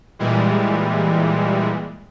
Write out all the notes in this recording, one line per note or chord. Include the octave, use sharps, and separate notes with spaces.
A#2 E3 G3 G#3